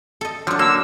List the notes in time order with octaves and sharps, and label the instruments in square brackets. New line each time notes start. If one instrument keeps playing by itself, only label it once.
[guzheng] A4 D#5
[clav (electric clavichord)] D3 F3 [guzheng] F#3 D4
[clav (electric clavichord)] D3 A#3 [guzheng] F#4 [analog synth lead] E6